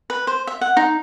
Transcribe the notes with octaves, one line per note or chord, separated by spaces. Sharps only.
B4
C5
E5
F#5
D#4